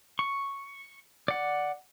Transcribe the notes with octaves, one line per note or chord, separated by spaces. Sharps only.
C#6
D5 F#5